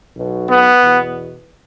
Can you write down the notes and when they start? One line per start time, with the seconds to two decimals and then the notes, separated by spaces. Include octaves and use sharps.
0.17 B1 B2
0.50 B3
0.83 E2 B2